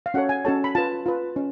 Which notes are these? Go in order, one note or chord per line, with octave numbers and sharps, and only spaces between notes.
F5
C#4 F#4 A4 C#5 F#5
G#5
C#4 F#4 A4 C#5 A5
B5
F4 B4 A5
F4 B4
C#4